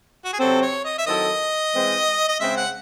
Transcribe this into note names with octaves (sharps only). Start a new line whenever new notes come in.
F#4
G#4
C3 F#3 C4 A4
C#5
D#5
E5
D#3 F#3 C4 E4 A4 D#5
E3 G#3 C4
D#5
C#3 G#3 C4 E5
F#5